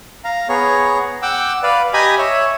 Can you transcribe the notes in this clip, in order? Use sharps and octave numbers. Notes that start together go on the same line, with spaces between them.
F5 A#5
B3 G#4 C#5 A#5
F#5 G5 D6 E6
B4 D5 F5
G4 D#5 G#5 A#5 B5 D#6
C#5 E5